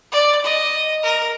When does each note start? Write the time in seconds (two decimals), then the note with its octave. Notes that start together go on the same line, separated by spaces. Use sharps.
0.12 D5
0.44 D#5
1.03 A#4